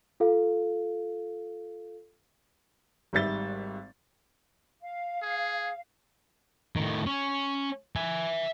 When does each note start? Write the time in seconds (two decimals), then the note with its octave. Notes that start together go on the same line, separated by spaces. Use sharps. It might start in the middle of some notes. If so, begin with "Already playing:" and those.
0.20 F4 A4 F5
3.13 G#1 G#2 G3 E5 A6 G7
4.81 F5
5.22 G#4
6.76 A2 D#3
7.06 C#4
7.96 E5 G#5